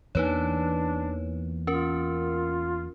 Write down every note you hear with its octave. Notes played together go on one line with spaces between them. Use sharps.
E2 E3 A#3 D4 D#4 B4 C#5
C#4 F4 A#4